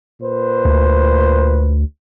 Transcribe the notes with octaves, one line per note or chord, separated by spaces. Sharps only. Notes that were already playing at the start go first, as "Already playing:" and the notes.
A#2 B4 C5
D2